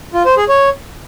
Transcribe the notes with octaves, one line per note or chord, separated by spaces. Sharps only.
F4
C5
G#4
C#5